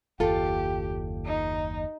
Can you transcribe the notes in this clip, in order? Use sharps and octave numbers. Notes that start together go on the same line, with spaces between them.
F#1 D#2 F4 G4 A4
D#4